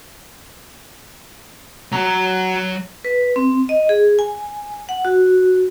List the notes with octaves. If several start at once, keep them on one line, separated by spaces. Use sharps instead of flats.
F#3 A#5
B4
C4
D#5
G#4
G#5
F#5
F#4